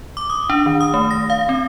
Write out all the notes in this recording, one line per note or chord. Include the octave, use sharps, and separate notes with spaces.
D6
D#6
D4
D#3
D#6
A3
A#6
F5
C4